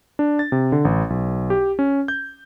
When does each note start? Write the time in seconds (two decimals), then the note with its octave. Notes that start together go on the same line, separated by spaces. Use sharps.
0.19 D4
0.39 A6
0.52 C3
0.72 D3
0.85 A1
1.10 B1
1.50 G4
1.79 C#4
2.08 G6